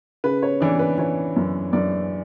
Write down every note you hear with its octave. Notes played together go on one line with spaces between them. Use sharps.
C#3 B4
C#5
E3 D4 D5
B4
E3 C#5
F#2
F#2 D4 D5